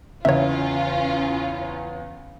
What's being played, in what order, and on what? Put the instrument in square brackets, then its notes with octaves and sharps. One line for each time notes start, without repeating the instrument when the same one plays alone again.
[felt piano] E2 C#3 [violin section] C#4 F4 [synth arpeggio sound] C#5 E5